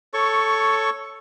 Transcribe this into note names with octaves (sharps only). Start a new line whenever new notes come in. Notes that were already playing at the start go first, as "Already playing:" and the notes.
A4 C#5 C#6